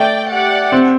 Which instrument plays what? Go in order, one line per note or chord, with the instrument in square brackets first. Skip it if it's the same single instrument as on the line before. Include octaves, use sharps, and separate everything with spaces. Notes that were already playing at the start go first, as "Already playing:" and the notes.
Already playing: [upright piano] A3 [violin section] D5 G5
[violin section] G4 D5 F#5
[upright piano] C4